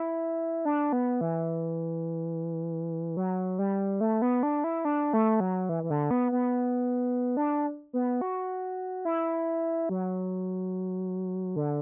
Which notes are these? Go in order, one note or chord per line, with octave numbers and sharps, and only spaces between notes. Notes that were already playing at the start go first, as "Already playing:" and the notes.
Already playing: E4
D4
B3
E3
F#3
G3
A3
B3
D4
E4
D4
A3
F#3
E3
E3
D3
B3
B3
D4
B3
F#4
E4
F#3
D3